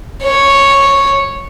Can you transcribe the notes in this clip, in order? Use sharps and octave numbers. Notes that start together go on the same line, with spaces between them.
C#5